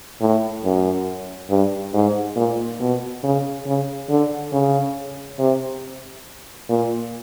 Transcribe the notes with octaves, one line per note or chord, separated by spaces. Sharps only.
A2
F#2
G2
G#2
A#2
B2
C#3
C#3
D3
C#3
C3
A#2